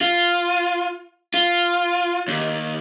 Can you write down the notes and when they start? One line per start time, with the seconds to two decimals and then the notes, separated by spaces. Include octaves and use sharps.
0.01 F4
1.34 F4
2.28 D#2